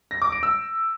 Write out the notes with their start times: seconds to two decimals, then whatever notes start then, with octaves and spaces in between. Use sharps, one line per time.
0.11 A#6
0.22 D6
0.32 D7
0.43 E6